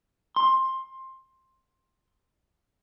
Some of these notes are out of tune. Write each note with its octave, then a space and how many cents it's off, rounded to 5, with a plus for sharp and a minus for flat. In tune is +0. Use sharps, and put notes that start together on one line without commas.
C6 +15